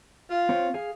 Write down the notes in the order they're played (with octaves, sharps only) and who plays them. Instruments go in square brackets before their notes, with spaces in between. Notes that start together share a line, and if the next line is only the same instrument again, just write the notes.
[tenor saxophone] F4
[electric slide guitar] C4 C#5
G#4 F5